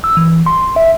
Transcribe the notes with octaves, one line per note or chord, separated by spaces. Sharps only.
E6
E3
C6
E5